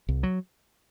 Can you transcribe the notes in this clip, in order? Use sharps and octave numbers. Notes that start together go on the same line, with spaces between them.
C2
F#3